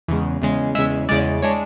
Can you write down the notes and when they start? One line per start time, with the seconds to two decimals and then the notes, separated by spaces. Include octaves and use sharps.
0.08 E2 C#3 G#3
0.42 E2 C#3 G#3
0.75 E2 C#3 G#3 E5
1.09 E2 C#3 G#3 D5
1.42 G#3 D4 C#5